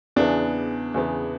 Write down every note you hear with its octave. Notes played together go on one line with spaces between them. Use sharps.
E2 C#3 E3 B3 D4
E2 C#3 E3 B3